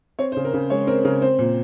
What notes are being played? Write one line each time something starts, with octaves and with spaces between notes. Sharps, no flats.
C4 C#5
C5
C#3
A#4
C#3
G#3 C#5
C4 A#4
C#3 A#4
C4 C5
A#2